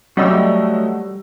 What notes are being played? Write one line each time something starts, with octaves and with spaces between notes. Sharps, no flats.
F#3 G3 A3 F#4 D#5 E6